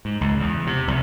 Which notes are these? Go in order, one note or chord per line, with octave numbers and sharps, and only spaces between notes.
G#2
C#2
E2
C3
C2